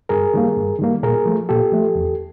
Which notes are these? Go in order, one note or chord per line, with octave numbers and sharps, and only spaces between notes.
G2 G#4 A#4
D#3 G3 A#3
G2
D#3 G3 A#3
A#2 G#4 A#4
F3 A3
A#2 G4 A4
F3 A3
E2